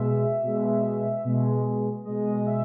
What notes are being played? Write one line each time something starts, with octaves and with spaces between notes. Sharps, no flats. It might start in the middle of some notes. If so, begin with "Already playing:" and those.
Already playing: B2 G#3 E5
B2 G#3
B2 G#3
B2 G#3 D#5
E5